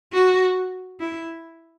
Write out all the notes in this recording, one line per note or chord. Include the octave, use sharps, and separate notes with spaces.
F#4
E4